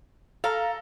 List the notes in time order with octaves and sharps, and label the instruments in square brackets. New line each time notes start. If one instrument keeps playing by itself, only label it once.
[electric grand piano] A4 A#5 [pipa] F5